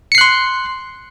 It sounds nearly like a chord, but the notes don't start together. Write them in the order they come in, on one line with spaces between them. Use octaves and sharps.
C#7 C7 F#6 C6